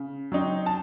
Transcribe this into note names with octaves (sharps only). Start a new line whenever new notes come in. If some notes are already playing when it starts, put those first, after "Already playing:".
Already playing: C#3
F#3 C4 D#4
A5